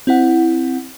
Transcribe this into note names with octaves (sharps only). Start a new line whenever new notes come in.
C4 E4 F#5